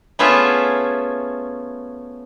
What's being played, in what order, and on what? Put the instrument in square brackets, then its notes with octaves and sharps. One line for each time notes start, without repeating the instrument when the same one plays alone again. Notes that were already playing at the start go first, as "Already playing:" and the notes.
[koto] A3 B3 C#4 F4 G#4 E5